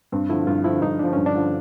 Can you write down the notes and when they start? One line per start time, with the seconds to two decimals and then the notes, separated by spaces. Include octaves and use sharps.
0.12 G2 C4
0.29 D3 F3 E4
0.47 G2 F4
0.64 D3 F3 E4
0.82 G2 D#4
0.99 D3 F3 D4
1.13 G2 C#4
1.26 D4
1.34 D3 F3